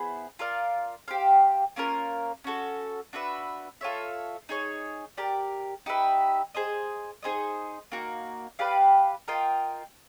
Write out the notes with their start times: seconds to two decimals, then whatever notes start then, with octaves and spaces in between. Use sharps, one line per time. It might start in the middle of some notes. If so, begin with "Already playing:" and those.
Already playing: B3 E4 G#4 C5
0.39 F4 A#4 D5 F5
1.08 G4 C5 F5
1.76 A#3 C#4 F4 A#4
2.44 C#4 F#4 A4
3.13 D4 F#4 B4 E5
3.81 F4 A4 C#5 E5
4.49 D#4 G#4 C#5
5.17 G4 A#4 D5
5.86 D#4 G4 B4 E5
6.54 G#4 C5 D#5
7.23 D#4 G#4 C5 D#5
7.92 A#3 D#4 F#4
8.59 G4 B4 D5 F5
9.28 F4 A#4 D#5 G5